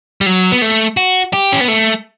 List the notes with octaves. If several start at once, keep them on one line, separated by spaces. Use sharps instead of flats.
G3
F#3
B3
A3
F#4
G4
C#4
B3
A3